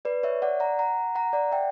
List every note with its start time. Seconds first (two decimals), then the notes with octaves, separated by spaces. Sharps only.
0.05 B4 D5
0.23 C#5 E5
0.42 D5 F#5
0.60 F#5 A#5
0.79 F#5 A#5
1.15 F#5 A#5
1.33 D5 F#5
1.52 E5 G5